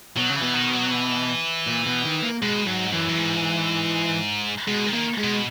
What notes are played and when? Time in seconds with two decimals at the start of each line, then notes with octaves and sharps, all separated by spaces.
0.17 B2 F#3
0.30 C#3
0.36 E3
0.42 B2
0.55 D#3
0.74 F#3
0.92 E3
1.67 A#2
1.86 B2
2.05 D#3
2.23 A#3
2.42 B2 G#3
2.67 G#2 F#3
2.92 F#2 E3
3.09 F#2
3.17 G#2
4.68 B2 G#3
4.87 D#3
4.93 A#3
5.18 G#3
5.24 B2